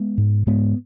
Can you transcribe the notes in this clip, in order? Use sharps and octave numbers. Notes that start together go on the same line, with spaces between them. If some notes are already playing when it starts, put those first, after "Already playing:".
Already playing: G#3 B3
G#2
G#2 G#3 B3